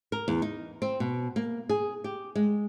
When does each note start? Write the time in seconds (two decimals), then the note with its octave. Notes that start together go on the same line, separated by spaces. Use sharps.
0.12 A#4
0.28 E2
0.42 D#4
0.82 C4
1.00 B2
1.36 A#3
1.69 G#4
2.04 G4
2.35 G#3